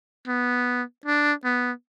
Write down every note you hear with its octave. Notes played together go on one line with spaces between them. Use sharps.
B3
D4
B3